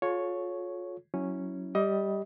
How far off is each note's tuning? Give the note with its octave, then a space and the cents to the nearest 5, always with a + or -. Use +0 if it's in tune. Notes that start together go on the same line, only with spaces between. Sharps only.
F4 +30 A4 -40 C#5 +0
F#3 +0 C#4 -5 E4 -20
G3 +0 G4 +0 D#5 +20